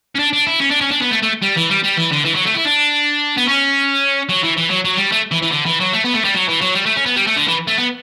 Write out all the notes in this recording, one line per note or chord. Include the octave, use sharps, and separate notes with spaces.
C#4
D4
D4
E4
C#4
D4
C#4
D4
B3
A3
A3
G3
E3
G3
G3
E3
D3
E3
F#3
A3
E4
D4
B3
C#4
F#3
E3
E3
F#3
F#3
G3
A3
E3
E3
D3
E3
F#3
A3
B3
A3
G3
F#3
E3
F#3
G3
A3
C#4
B3
G3
A3
D3
E3
A3
B3